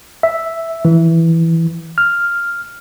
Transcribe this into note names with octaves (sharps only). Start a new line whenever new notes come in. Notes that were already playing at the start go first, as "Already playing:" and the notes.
E5
E3
F6